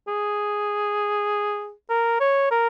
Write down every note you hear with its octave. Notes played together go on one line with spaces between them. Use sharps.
G#4
A#4
C#5
A#4